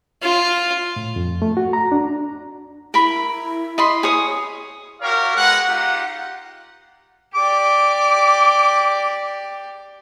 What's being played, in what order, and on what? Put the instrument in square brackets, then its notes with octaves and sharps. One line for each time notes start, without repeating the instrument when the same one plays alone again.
[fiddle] F4
[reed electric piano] A2
F2
A3
F#4
A#5
D4
[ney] E4 [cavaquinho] A#4 B5
[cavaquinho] D#5 B5 C6
G#4 C#5 D#6
[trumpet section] F#4 G4 A#4 C#5 F5
G#3 B3 F#5
D#4 F4 G4 F#5
[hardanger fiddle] G4 D5 [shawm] D6